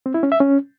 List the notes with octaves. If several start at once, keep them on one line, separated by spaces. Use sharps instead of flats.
C4
E4
C#4
E5
C#4